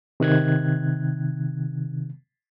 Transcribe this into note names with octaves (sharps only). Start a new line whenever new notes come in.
C3 D#3 F#6 G#6